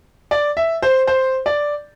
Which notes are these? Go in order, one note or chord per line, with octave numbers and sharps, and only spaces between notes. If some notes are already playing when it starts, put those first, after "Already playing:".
D5
E5
C5
C5
D5